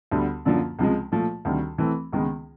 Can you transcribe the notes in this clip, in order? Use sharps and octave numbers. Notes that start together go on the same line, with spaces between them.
D2 D3 G3 B3
F#2 D3 F3 A#3
C#2 C3 F3 G#3
A#2 F3 A3
D2 C3 D#3 G3
E3 A3 C4
C#2 C3 D#3 G#3 B3